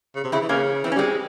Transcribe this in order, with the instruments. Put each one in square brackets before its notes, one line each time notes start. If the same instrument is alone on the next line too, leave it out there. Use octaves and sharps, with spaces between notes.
[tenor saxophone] C#3
C3
[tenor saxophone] C#3 [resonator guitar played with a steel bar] C4 E4
[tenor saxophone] E3
[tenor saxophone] C#3 [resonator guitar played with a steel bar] A#3 C#4
[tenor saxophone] E3 [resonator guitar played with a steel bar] C4
[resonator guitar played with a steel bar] C#4
[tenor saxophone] G3 [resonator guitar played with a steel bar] G#3 C4